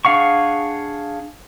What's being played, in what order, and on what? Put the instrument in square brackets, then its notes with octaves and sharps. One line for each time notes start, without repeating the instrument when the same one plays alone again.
[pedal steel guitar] D4 G#4 F5 F#5 C#6